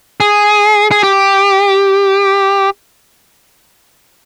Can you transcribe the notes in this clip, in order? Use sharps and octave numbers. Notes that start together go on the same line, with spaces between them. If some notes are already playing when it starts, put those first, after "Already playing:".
G#4
G#4
G4